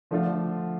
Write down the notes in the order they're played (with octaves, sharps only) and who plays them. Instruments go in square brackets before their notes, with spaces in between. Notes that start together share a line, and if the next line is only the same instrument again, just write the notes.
[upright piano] D3 A3 D4 F4 [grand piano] F3